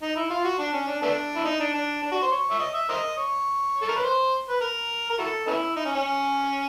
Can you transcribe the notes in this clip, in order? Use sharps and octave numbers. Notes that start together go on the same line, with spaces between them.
D#4
E4
F4
F#4
D4
C#4
D4
A3 B3 D4
E4
D#4
D4
D4
D4
F#4
C5
C#5
E5
D#5
E5
A#4 C5 D#5
C#5
A4
A#4
B4
C5
B4
A#4
A#4
E4 F#4 A4
B3 C#4 E4
D#4
C#4
C#4